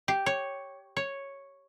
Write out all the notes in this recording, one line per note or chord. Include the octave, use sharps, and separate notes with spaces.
G4
C#5
C#5